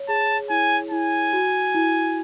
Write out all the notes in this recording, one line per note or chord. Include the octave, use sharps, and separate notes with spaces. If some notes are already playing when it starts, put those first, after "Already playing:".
Already playing: C#5
G#4 A5
E4 G#5
E4 G#5
F#4
E4